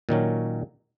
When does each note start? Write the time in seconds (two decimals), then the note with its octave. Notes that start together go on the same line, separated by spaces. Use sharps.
0.09 A#2 D#3 F#3 C#4